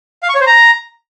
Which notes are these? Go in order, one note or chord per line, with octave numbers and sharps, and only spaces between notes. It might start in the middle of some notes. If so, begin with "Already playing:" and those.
F5
C#6
C#5
C5
A#5